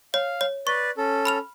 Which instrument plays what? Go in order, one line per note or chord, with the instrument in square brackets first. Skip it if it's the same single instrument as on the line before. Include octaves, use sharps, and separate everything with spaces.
[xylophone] C#5 [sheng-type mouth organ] F5
[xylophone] C#5
[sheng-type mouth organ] B4 D5 [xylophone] C#6
[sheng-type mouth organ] C#4 A4
[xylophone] B5 F6 F7